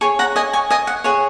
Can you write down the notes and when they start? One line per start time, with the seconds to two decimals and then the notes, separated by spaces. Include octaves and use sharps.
0.01 G#4 C#5 G#5 C#6
0.19 F#5 A#5
0.36 D#5 G#5
0.53 G#5 C#6
0.70 D#5 G#5
0.87 F#5
1.04 G#4 C#5 F#5